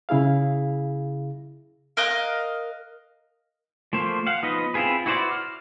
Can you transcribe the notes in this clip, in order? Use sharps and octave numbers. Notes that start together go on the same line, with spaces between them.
C#3 E4 G#4 F5
A#4 D#5 F5 F#6
F3 A3 A#3 C5
F5 F#5
F3 B3 D#4 B4 D#5
C4 E4 F4 G#4 B4
E4 F#4 B4 C5 D5
F6